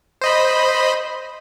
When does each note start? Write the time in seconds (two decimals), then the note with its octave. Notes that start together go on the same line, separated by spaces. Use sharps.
0.21 C5 D#5 B5